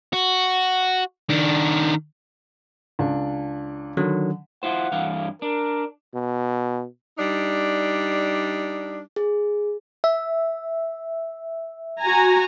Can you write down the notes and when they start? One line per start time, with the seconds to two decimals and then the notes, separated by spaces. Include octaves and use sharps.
0.13 F#4
1.30 D#3 D4
2.99 C#2 D4
3.97 D3 D#3 F#3
4.63 E4 F4 C5 F#5
4.92 G2 E3 F5
5.42 D4 A#4
6.14 B2
7.18 G3 D4 D#4
9.16 G#4
10.04 E5
12.00 F#4 G#5 A#5